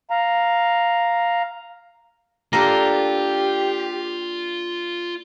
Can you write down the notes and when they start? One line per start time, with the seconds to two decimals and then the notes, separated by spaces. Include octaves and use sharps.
0.10 F5 A#5
2.53 A#3 D4 F4 G4 A4 A#5